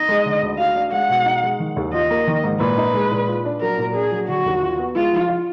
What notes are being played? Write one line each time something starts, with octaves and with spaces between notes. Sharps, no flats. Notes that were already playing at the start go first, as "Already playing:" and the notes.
Already playing: D#4 D#5
G#3
D3
D2
F#4 F5
D4
G#3 F#5
B2
D#4
G#3
D#3
D#2
F4 D#5
A#3
D#3
G#2
A#2 B4
D#4
G#3
A#2
F4
D4
F#3 A#4
A#2
D4 G#4
F#3
D3 F#4
D#2
F4
B3
G#3 F4
F3
F4